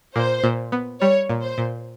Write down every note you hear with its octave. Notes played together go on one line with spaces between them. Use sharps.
A#2 C5
A#2
B3
G3 C#5
A#2
C5
A#2